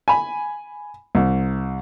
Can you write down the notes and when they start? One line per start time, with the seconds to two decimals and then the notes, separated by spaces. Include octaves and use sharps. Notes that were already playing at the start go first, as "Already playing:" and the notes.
0.08 G#5 B5
1.15 C2